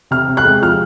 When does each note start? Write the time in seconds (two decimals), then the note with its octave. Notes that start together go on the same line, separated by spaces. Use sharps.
0.11 C3 F6
0.28 C3
0.37 F#6
0.45 G#3
0.62 F3 F6